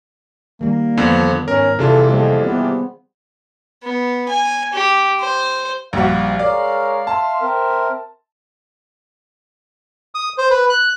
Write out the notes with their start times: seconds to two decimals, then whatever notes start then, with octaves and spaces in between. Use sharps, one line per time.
0.61 D#3 G3 A#3
0.97 F2 D3 F3 B3
1.48 G#2 C#4 A#4
1.79 C3 E3 D4 F4 G#4 A4
2.10 F2 G3 A#3
2.46 C3 B3 C4 G#4
3.83 B3
4.29 G#5
4.73 G4
5.20 C5
5.93 A#1 G3 F#4 F5
6.39 G#3 A#4 C#5 D5
7.07 E5 A5 C6
7.42 C4 A#4
10.15 D#6
10.38 C5
10.51 B4
10.70 F#6